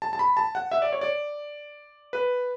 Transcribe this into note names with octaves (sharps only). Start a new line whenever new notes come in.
A5
A5
B5
A5
F#5
E5
D5
C#5
D5
B4